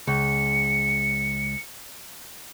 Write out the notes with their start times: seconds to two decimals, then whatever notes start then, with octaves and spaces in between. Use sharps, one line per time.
0.07 C#2 C#7